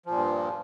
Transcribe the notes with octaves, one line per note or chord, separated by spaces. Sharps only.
G2 A#2 F3